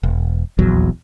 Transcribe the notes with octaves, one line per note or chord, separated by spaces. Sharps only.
E1
D#1 A#1 E2 F#3